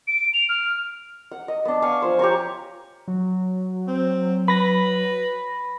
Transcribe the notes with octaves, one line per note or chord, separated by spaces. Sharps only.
D7
F7
F6
F#5
D#5
B3 D4
F5 G#5 C#6
F3 C5
G4 C#5 A#5 C#6
F#3
C4
B4 B5 A#6